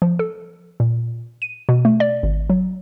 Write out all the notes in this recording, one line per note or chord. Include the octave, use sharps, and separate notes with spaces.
F3
A4
A#2
D#7
B2
A3
D5
G#1
F#3